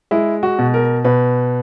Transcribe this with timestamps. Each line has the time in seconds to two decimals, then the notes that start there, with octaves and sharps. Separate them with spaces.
0.11 G#3 E4
0.43 F#4
0.59 B2
0.74 A#4
1.05 B2 B4